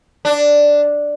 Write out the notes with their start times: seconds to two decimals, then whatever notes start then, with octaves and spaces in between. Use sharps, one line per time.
0.25 D4